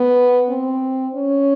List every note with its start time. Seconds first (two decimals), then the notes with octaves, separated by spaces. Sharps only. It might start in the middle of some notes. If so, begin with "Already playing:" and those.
Already playing: B3
0.50 C4
1.15 C#4